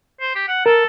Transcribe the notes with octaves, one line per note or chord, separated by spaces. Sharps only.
C5
G4
F#5
A4 A#4